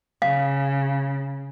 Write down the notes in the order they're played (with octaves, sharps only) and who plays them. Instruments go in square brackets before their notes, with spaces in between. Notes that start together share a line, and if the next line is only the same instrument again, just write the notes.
[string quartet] C#3 [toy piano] F5